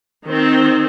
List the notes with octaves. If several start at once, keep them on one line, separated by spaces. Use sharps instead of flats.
D#3 C4